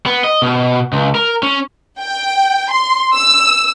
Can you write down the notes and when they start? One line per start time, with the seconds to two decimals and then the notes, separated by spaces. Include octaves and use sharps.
0.06 B3
0.24 D#5
0.42 B2
0.93 C#2
1.15 A#4
1.43 C#4
2.00 G5
2.71 C6
3.14 E6